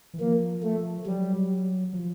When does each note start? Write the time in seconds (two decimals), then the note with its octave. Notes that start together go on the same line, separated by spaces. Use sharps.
0.14 E3
0.20 F3 A#3
0.63 A3
1.06 F#3 G3
1.93 F3